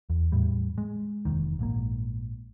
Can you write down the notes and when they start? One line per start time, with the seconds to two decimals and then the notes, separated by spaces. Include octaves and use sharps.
0.10 E2
0.32 E2 A2 G3
0.78 G#3
1.25 F1 D#2 D#3
1.59 A#1 G#2 A#3